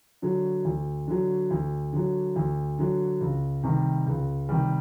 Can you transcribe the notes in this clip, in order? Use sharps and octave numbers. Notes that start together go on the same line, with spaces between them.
D3 F#3
D2
D3 F#3
D2
D3 F#3
D2
D3 F#3
C#2
C3 D#3 G3
C#2
C3 D#3 G3